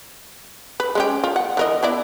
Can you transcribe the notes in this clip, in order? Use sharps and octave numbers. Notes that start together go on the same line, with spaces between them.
B4
G#3 C#4 G4
F4
F#5
E3 A#4 D#5
B3 E4 D5